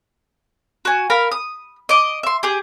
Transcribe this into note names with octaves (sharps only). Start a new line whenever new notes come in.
F#4 G#5
A#4 F5 B5
D#6
D#5 D6
E5 C6
G4 G#4